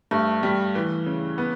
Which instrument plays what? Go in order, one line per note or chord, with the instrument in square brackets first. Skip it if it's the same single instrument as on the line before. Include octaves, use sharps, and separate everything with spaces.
[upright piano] G2 [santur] A3
[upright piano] G3
E3
C#3
B3